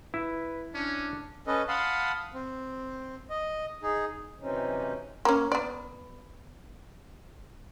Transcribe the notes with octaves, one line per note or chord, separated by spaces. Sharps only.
E4 B4
C#4 D4
C#4 A4 B4 D#5
F5 F#5 A5 B5 C6 D#6
C4
D#5
D#4 G#4
C3 E3 F#3 C4 C#4 D#4
A#3 C#4
B3 D5